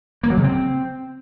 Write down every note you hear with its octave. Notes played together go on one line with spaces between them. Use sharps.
A#3
F#3
C#3
C4